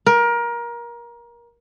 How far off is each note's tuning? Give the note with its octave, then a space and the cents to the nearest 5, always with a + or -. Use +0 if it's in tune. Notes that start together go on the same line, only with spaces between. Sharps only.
A#4 +25